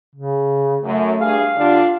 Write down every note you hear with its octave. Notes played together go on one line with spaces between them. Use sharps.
C#3
F#2 A3
G2 G#4 F5
D3 D4 F4 G4